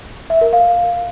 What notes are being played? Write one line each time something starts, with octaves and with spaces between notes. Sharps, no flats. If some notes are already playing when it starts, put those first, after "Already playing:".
E5
A#4
F5